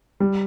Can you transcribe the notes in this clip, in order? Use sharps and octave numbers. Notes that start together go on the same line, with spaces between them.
G3